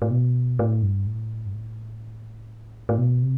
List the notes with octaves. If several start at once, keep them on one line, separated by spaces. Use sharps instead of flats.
A2
B2
A2
G2
A2
G2
A2
A2
B2
C3